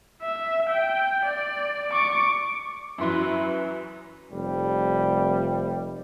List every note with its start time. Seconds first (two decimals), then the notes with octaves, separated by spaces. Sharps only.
0.22 E5
0.69 G5
1.26 D5
1.92 C#6 D6
2.98 F#2 E3 F#3 E4 B4 E5 C6
4.31 F1 G3